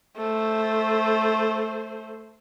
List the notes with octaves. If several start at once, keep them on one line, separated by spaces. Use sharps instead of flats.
A3 C5